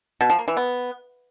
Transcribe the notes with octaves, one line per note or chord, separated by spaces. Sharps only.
B2
F3
A#3
E3
B3